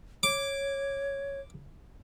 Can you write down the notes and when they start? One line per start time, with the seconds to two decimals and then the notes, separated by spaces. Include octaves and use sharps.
0.23 C#5 D6